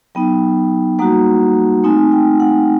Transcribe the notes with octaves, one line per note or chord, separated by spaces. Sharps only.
F#3 B3 D#4 G5
G3 A#3 D#4 F#4 F#5
A3 C4 D#4 G#5
G5
F#5